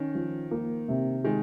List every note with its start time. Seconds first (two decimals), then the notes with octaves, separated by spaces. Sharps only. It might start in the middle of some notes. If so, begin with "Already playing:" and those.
Already playing: D#3 C#4
0.15 F3
0.51 A#3
0.88 C3
1.24 D#3 G#3